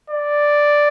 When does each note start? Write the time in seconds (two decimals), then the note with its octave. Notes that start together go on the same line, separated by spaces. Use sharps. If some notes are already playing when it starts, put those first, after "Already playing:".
0.10 D5